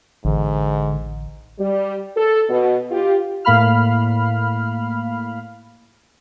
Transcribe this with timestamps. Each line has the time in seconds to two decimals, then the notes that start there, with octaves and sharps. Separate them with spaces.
0.25 A1 G#2 D3
1.58 G3
2.16 A4
2.48 B2
2.91 F4 G4
3.45 A2 A#3 F5 B5 F6